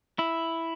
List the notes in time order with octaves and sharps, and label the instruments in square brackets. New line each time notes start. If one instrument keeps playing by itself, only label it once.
[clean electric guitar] E4